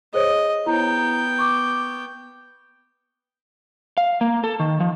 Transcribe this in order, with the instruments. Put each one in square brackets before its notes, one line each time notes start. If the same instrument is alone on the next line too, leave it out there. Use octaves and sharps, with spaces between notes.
[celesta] G#4 C5 C#5 [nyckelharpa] D#5
[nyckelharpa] B3 G5 [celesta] E4 A#5
[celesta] C#6 D6
[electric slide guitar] F5
A#3
A4
D#3
F3